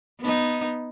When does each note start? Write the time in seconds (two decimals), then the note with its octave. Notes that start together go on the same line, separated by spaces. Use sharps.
0.21 B3 D#4